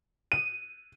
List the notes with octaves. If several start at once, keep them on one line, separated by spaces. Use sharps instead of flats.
D#7